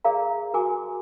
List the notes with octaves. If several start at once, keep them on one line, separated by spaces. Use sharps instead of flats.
G#4 A#4 D5 F5 A#5
F#4 A#4 G#5 D6